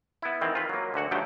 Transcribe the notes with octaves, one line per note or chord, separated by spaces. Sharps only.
B3 E4
D#3 E3 C4
F4 B4
F#3 A#3
D2 D3 F#4 F#5
D2 G2 F3 F#3 A3 G5